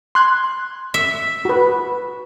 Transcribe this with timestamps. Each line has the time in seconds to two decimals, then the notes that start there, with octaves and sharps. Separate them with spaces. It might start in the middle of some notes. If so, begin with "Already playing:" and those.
0.15 C6 F#6 G#6
0.94 E5
1.45 F#4 B4